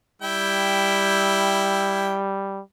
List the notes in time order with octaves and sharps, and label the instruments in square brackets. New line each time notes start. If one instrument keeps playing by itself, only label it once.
[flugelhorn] G3 [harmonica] E4 G5